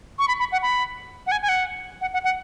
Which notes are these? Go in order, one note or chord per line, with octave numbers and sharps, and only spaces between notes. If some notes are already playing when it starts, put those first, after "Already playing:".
C#6
B5
B5
F#5
B5
F#5
G#5
G#5
F#5
F#5
F#5
F#5